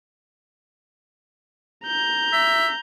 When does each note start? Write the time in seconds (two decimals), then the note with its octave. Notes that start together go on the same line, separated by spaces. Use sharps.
1.87 A#5 G6
2.33 E5